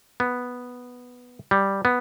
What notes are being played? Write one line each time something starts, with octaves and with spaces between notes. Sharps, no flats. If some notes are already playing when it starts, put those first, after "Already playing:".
B3
G3
B3